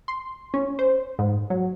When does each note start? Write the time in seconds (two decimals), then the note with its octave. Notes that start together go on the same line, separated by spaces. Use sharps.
0.08 C6
0.54 C#4
0.79 C5
1.19 G#2
1.50 F#3